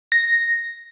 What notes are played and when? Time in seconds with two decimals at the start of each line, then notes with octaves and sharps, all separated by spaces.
0.12 A#6